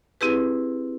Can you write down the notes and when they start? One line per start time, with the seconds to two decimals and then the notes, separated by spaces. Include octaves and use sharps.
0.21 C4 E4 G4 G#4 B4